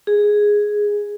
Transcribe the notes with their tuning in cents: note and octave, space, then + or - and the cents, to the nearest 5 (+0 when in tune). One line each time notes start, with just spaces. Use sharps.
G#4 +0